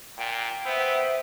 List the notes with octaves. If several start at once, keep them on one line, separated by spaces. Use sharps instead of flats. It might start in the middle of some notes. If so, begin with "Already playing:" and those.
A#2 G5
B3 C5 E5